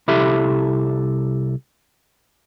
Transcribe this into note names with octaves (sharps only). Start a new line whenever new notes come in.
C2 E4 G4 A4 E5